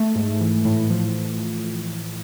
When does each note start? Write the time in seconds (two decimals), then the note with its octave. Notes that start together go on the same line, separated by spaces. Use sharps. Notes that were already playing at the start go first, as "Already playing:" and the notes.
Already playing: A3
0.16 G#2
0.40 E3
0.65 A2
0.90 F3